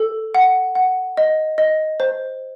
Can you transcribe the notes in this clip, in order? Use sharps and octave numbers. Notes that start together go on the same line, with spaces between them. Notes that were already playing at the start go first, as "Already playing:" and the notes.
Already playing: A4
F#5
F#5
D#5
D#5
C5